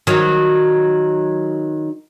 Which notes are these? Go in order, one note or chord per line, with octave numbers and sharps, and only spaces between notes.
D#3 F#3